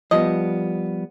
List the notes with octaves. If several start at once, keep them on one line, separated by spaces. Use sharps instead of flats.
F3 G3 B3 D#5